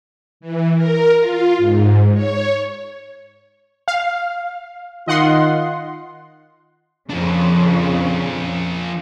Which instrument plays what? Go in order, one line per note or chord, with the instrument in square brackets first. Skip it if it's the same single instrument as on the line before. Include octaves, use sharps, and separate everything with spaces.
[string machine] E3
A#4
F4
G#2
C#5
[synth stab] F5
[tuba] D#3 [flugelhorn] F4 [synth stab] D#5 F#5 C6
[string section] F2 C#3 [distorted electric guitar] F3 D4